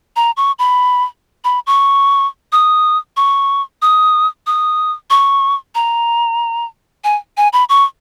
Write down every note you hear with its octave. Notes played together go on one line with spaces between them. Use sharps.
A#5
C#6
B5
B5
C#6
D#6
C#6
D#6
D#6
C#6
A#5
G#5
G#5
B5
C#6